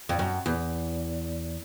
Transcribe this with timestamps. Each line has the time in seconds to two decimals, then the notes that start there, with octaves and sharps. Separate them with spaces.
0.09 F2
0.19 F#2
0.46 E2